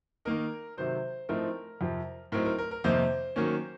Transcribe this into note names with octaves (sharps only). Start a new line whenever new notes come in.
D#3 A#3 D#4 A#4
C3 D#3 F#3 C5
A2 F3 A3 C4 D#4 A#4
F2 C3 F3
A2 F#3 C4 D#4 A#4
A#4
A#4
A#4
F2 C3 D#3 A#3 D#4 C5
D#3 F#3 A#3 C#4